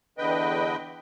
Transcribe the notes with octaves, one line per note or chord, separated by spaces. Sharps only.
E2 D3 B4 D#5 G5